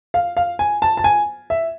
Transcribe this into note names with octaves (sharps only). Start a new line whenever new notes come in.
F5
F5
G#5
A5
A5
G#5
E5